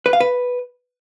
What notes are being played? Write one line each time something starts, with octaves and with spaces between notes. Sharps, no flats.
B4
F5
B4